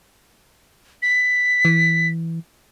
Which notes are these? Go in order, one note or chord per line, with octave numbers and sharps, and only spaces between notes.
B6
E3